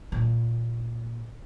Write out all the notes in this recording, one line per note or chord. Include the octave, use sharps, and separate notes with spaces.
A#2